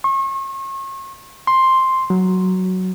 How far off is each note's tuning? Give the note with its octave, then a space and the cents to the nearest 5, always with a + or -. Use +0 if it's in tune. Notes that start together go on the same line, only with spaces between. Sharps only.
C#6 -40
C6 +5
F#3 +5